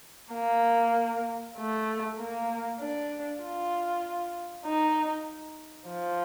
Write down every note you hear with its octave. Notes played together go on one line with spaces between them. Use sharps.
A#3
A3
A#3
D4
F4
D#4
F3